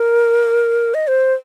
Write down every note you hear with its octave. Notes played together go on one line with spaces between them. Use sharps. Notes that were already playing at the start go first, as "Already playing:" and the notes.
Already playing: A#4
D#5
C5